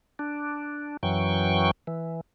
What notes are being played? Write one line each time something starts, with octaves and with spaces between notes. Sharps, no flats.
D4
F#2 E3 F#3 G5 C#6
E3